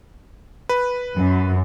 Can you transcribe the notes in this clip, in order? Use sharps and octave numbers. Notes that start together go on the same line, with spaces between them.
B4
F#2